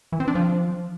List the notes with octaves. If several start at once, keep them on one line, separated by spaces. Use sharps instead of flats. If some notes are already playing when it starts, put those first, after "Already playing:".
E3
C4
D4
F3